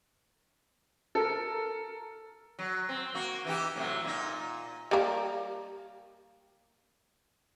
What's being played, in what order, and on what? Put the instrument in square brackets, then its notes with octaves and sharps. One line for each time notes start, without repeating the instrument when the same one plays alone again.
[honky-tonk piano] A4 A#4
[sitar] F#3
C4
A#3 F#4
E3 D#4 G4
A2 C3 F#3
A#2 D#4
[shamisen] G3 A#3